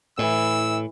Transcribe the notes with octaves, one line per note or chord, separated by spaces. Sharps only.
A2 E3 E6